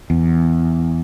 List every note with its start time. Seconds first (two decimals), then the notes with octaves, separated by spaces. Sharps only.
0.10 E2